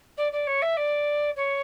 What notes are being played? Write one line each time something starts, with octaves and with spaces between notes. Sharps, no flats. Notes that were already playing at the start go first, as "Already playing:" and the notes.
D5
D5
C#5
E5
D5
C#5